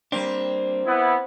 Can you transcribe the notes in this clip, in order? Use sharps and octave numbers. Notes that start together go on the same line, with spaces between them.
G3 A#3 C4 D4
B3 E4